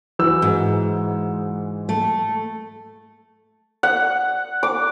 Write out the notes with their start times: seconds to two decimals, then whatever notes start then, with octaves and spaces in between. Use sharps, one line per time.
0.19 E3 F#4 E6
0.42 G#2
1.89 A3
3.83 F#5
4.63 D6